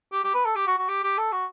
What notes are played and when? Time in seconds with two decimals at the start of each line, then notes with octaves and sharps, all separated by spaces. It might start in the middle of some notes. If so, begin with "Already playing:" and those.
0.12 G4
0.23 G4
0.34 B4
0.45 A4
0.55 G4
0.67 F#4
0.77 F#4
0.88 G4
1.03 G4
1.18 A4
1.32 F#4